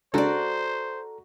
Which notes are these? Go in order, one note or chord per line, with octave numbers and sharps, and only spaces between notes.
C#3 G#3 D4 F#4 A4 C5 D5 A#5